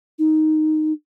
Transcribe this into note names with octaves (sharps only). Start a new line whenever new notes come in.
D#4